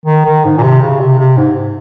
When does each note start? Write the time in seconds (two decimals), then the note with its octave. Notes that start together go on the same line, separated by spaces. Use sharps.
0.06 D#3
0.25 D#3
0.45 G#2
0.58 A#2
0.63 C3
0.82 C#3
1.00 C3
1.19 C3
1.37 G#2